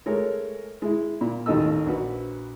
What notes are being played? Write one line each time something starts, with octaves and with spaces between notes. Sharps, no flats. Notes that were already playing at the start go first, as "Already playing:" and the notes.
G#3 A3 A#4 C#5
G#3 E4
A#2
A1 D#2 D#3 A4 D#5 E6
A#1 F#4 B4